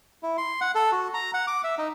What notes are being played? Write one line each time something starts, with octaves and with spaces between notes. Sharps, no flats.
E4
C6
F#5
A4
F#4
A#5
F#5
D6
E5
D#4